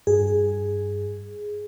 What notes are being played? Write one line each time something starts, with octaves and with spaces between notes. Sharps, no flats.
G2 G#4